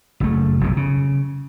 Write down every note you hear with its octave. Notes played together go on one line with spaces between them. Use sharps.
F#1 F#2 A3
F1 B1 F2 C3
C#3